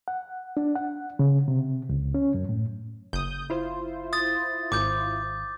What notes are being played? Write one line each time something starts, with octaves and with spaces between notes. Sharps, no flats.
F#5
D4
F#5
C#3
C3
C#2
C#4
F#2
A2
F#1 D#6 G6
E4 F4 C5
D#6 A6
G#1 D6 G6